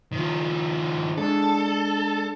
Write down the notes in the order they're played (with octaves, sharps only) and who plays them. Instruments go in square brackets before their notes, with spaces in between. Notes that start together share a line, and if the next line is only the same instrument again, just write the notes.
[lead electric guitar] D#3 F3
[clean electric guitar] G#3 D4 G#4 [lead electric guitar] A4